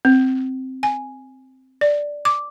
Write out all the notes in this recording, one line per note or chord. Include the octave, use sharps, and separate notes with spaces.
C4
G#5
D5
D6